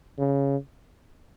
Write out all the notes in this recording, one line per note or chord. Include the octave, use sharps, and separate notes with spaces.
C#3